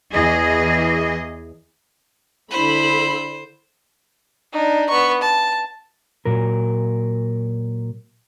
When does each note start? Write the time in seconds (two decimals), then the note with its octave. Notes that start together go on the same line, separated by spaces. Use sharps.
0.12 E2 E3 G#4 D#5
2.51 D3 E4 C5 B5
4.53 D4 D#4
4.90 B3 C#6
5.22 A5
6.25 A#2 F#3 A#4